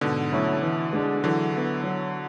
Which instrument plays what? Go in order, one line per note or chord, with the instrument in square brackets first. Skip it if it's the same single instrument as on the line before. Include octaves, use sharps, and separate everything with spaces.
[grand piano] G#2 [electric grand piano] B2 D3
[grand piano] F#3 A3 C#4 E4
E3
G#3 D4 G#4
[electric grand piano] D3 F#3 [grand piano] E3
[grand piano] B3 E4 A4
F#3